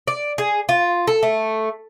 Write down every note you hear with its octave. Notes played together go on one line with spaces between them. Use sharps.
D5
G#4
F4
A4
A3